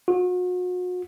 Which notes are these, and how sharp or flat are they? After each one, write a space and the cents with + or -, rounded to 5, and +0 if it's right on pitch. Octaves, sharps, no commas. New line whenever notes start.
F#4 -40